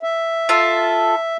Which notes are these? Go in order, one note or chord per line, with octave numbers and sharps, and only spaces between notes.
E5
F4 A4